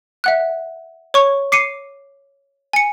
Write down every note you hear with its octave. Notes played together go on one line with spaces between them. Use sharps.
E5 F#5 F#6
C#5 C#6
D6 C7 C#7 D#7
G#5 C#7